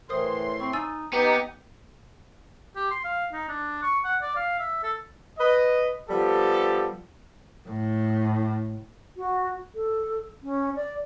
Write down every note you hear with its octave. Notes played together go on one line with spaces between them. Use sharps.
A2 E3 A#4 C5 C6 D#6
C4 B5 C#6
D#4 G#5 E6 A6
B3 D#4 G4 B4
G4
C6
F5
D#4
D4
C#6
F#5
D5
F5
E5
A4
B4 D#5
F3 G3 B3 G4 A4
A2
F#4
A4
C#4
D5